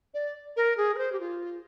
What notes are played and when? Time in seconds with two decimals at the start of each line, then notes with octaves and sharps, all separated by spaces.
0.14 D5
0.56 A#4
0.77 G#4
0.94 A#4
0.98 C5
1.12 G4
1.20 F4